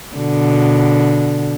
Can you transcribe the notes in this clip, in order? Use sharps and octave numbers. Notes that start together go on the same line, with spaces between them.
B2 D3